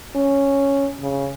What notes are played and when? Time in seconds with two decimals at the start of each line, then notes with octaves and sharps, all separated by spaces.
0.16 C#4
1.01 C#3